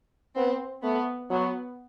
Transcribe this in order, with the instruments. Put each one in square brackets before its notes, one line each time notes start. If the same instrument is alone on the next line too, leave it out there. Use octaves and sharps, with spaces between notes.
[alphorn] B3 [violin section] C4
[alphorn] A3 [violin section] B3
[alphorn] F#3 [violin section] B3